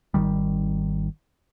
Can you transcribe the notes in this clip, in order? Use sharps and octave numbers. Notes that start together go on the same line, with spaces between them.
G#1 E2 D#3 G3